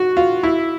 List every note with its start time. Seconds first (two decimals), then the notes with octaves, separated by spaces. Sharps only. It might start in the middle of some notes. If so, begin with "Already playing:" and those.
Already playing: F#4
0.17 F4
0.43 E4